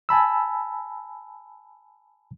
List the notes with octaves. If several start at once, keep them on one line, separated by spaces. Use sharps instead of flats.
G#5 A5 B5 E6